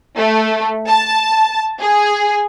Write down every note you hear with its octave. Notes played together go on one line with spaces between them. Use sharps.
A3
A5
G#4